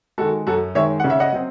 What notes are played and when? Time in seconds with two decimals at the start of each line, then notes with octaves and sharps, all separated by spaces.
0.18 D#3 G#3 F#4 A4
0.47 F#2 F#4 A4
0.75 D#3 G#3 C#5 E5
1.00 C#3 F#5
1.10 E5
1.20 D#5 F#5
1.33 F#3 C4